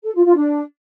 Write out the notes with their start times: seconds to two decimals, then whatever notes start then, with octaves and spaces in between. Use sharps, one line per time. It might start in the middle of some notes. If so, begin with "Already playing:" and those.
0.03 A4
0.14 F4
0.25 F4
0.35 D4